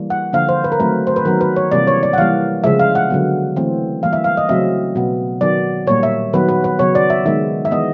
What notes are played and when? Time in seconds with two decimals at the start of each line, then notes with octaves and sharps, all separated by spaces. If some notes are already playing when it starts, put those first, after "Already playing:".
Already playing: E3 G3 A#3
0.10 F#5
0.33 D3 F3 A#3 F5
0.49 C5
0.64 B4
0.72 A#4
0.80 D#3 F#3 A3 C4 B4
1.07 C5
1.16 B4
1.25 D#3 F#3 B3 A#4
1.41 B4
1.56 C#5
1.72 C3 E3 G3 A#3 D5
1.87 C#5
2.03 D5
2.13 F#5
2.18 E3 G3 A#3 F5
2.64 C#3 F3 G#3 E5
2.79 F5
2.95 F#5
3.10 D3 F#3 B3
3.56 E3 A3 C4
4.03 E3 G3 A#3 F5
4.13 E5
4.24 F5
4.37 D#5
4.49 C#3 F#3 A3 C4 E5
4.96 B2 F#3 B3
5.41 D#3 F#3 B3 D5
5.87 A#2 G3 A#3 C#5
6.03 E5
6.33 D#3 F#3 B3 B4
6.48 B4
6.64 B4
6.79 C#3 F#3 B3 C#5
6.95 D5
7.10 E5
7.26 D#3 G#3 B3 E5
7.65 E5
7.71 E3 G#3 B3 D#5